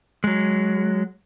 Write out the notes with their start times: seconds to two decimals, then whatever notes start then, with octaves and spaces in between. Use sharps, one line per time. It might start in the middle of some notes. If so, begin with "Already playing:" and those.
0.24 F#3 G#3